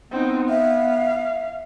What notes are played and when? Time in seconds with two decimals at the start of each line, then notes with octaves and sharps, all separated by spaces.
0.11 B3 C4 D#4
0.49 E5 F5